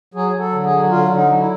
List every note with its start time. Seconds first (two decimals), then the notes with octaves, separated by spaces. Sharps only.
0.14 F#3 G#4
0.33 F#3
0.39 A4
0.51 D3
0.64 G#4
0.70 F#3
0.89 D3 F4
1.08 D3
1.15 D#4
1.27 F#3
1.39 E4